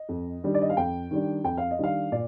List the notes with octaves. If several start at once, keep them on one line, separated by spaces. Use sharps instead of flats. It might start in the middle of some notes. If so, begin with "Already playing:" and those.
Already playing: D#5
F2
D#3 G3 D4
D5
D#5
F5
F2 G5
D#3 G3 D4
F2 G5
F5
D#5
D#3 G3 D4 F5
A#2 D5